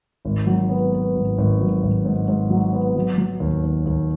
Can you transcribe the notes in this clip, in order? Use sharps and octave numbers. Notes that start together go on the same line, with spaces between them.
G#1
F#3
B3
B3
G#1
G#1
F#3
G#1
G#2
G#2
F#3
B3
F#3
F#3
D#2
D#2
D#2